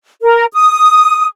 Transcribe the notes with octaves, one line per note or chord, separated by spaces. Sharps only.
A#4
D#6